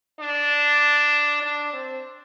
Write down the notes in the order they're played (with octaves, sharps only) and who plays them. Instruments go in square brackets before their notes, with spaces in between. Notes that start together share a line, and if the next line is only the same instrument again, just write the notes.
[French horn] D4
D4
C4